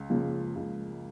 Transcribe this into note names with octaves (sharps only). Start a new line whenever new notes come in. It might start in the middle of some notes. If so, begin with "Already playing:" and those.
Already playing: C#2
C#3 F3 A#3
C#2